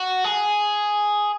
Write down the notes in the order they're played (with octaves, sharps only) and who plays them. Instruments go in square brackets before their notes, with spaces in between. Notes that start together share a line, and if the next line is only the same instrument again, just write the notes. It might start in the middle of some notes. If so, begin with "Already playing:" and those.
Already playing: [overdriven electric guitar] F#4
G#4